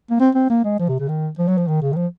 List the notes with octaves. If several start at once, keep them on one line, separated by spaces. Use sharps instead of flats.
A#3
C4
C4
A#3
G#3
F3
C3
C#3
D#3
F3
F#3
F3
D#3
C#3
D#3
F3